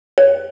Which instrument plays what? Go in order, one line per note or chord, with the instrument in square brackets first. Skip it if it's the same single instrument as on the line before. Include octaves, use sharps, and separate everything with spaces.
[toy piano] C#5